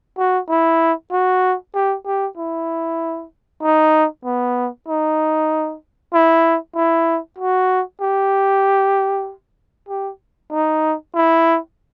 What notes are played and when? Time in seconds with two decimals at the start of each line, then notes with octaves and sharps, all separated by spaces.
0.18 F#4
0.49 E4
1.12 F#4
1.74 G4
2.06 G4
2.37 E4
3.63 D#4
4.25 B3
4.88 D#4
6.13 E4
6.75 E4
7.38 F#4
8.01 G4
9.89 G4
10.52 D#4
11.15 E4